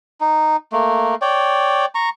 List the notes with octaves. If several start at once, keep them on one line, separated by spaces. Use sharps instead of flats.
D#4
A3 A#3
C#5 D5 G5
A#5 C#6